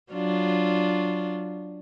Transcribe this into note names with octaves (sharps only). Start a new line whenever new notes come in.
F#3 D4 F4